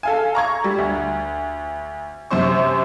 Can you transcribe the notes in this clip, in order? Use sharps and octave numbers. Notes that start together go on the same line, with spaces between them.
A4 F5 G#5
A#5 C#6 G#6
G3
D2
F#2 C3 C5 C#6